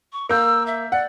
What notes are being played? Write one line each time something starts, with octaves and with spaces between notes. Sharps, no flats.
C#6
A#3 E6 G6
E5
D5 F#5